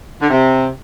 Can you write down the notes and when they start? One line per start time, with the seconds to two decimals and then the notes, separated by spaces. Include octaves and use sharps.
0.20 D3
0.29 C3